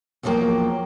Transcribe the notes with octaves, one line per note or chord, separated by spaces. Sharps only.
E2 C#3 F3 F#3 A#3 G5